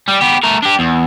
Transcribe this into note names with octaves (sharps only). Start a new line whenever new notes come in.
G3
B3 G4
A3 A#4
D4 G4
E2